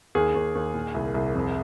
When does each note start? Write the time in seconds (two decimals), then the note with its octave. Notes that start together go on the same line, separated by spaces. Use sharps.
0.15 D#2 G#4
0.35 D#2
0.55 D#2
0.74 A#2
0.95 C2
1.14 C2
1.34 F2